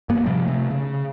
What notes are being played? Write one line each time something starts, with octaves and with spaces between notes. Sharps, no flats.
F#2 A#3 B3
A2 C3 F3 G3
C3 A3
C#3